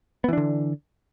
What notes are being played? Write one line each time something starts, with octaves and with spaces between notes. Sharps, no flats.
D3 E3 B3 D4